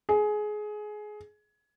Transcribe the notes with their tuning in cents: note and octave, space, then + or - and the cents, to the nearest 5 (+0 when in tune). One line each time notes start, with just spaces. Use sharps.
G#4 +20